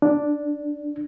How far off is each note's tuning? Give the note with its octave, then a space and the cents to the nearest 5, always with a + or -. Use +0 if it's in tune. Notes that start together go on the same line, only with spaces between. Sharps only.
D4 +0